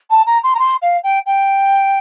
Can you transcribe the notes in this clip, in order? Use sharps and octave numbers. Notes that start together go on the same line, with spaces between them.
A5
A#5
C6
A#5
C6
F5
G5
G5